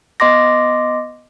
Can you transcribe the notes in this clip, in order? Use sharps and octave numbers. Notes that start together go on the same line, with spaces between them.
B3 D#5 C6 D6 A#6